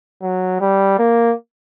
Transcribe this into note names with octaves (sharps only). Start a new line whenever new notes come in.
F#3
G3
A#3